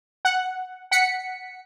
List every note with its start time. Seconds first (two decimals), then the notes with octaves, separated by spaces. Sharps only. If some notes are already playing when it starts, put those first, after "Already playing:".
0.25 F#5
0.91 F#5 B6 C#7